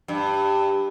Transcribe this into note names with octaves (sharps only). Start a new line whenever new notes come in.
G2